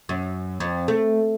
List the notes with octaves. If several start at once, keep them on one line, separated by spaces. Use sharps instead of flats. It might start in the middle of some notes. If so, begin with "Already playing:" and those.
F#2
F2
A3